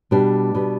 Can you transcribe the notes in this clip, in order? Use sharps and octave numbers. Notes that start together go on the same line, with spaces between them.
B2 G3 D4
B2 G3